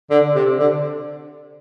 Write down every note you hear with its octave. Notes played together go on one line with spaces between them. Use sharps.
D3
C3
D3